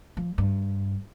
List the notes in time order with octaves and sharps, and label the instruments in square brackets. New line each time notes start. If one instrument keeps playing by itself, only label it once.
[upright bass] F3
G2